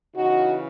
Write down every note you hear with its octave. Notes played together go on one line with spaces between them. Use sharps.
C#3 E3 D#4 F#4